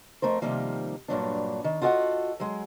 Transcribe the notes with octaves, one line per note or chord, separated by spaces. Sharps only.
F2 A3 A#4 C5
C3 D#3 F3 G3 A#3
G2 A#2 F#3 D4
D#3
F4 F#4 A4 D#5 F5 F#5
F#3 G#3